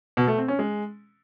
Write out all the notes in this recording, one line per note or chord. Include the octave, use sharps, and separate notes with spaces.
B2
A3
C4
C#4
G#3